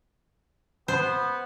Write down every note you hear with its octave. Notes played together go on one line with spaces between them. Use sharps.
B3 C5